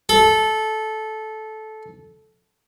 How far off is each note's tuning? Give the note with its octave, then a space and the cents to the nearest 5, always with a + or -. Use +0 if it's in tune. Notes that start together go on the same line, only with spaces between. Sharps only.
A4 -15